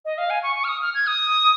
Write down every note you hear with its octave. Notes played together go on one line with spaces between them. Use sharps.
D#5
F5
G#5
C#6
C#6
F6
D#6
F6
G#6
D#6